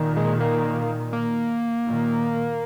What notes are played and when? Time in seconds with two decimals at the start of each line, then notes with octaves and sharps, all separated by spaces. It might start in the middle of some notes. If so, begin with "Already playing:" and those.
Already playing: A#2 D#3
0.16 G#3
0.40 A#3
1.13 A#3
1.84 A#2 D#3